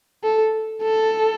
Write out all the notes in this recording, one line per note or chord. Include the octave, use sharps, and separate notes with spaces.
A4
A4